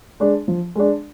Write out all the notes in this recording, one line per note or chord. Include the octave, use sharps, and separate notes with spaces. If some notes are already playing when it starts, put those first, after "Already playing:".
G#3 D4
F3
G#3 D4